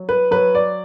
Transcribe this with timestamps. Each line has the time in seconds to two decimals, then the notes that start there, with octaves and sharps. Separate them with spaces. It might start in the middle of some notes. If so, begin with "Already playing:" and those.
Already playing: F#3
0.09 B4
0.31 F#3 B4
0.55 D5